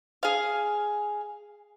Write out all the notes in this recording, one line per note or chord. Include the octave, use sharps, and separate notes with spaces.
G#4 F5